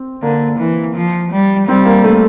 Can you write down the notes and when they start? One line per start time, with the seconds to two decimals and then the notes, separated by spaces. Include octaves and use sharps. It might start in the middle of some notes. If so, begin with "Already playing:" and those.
Already playing: C4
0.22 D3 A#3
0.59 E3
0.96 F3
1.31 G3
1.67 G3 C4
1.85 A#3
2.04 A3